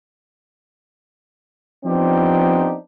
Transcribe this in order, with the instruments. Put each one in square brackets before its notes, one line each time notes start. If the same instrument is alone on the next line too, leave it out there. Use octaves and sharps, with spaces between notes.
[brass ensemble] F3 B3 C4 D4 D#4 G4